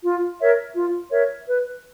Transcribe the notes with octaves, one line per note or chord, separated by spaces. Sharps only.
F4
A#4 C#5 E5
F4
A#4 C#5 E5
B4